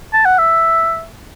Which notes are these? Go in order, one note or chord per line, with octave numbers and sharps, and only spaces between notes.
A5
F#5
E5